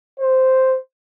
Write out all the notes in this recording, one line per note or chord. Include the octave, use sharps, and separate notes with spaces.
C5